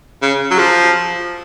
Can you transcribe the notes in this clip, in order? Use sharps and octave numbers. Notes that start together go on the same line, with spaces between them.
C#3
F#3
F3